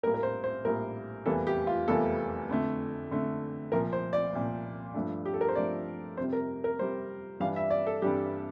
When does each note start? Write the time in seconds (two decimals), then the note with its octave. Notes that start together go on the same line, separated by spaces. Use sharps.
0.03 A#1 A2 G3 A#3 A#4
0.14 A#4
0.23 C5
0.44 C5
0.64 A#1 A2 G3 A#3 A#4
1.26 F1 E2 E3 G3 A#3 A4
1.47 G4
1.67 F4
1.88 F1 E2 E3 G3 A#3 A4
2.49 F2 D3 A3
3.11 F2 D3 A3
3.72 C2 A#2 F3 A#4
3.93 C5
4.13 D5
4.33 C2 A#2 F3
4.94 G2 F3 A3 D4
5.25 G4
5.34 A4
5.41 A#4
5.49 C5
5.55 G2 F3 A3 D4 D5
6.17 F2 C5
6.20 C3 G3
6.33 A#4
6.64 A#4
6.79 F2 C3 G3 C5
7.40 G2 E3 G3 D4 F5
7.56 E5
7.70 D5
7.87 A4
8.02 G2 E3 G3 D4 G4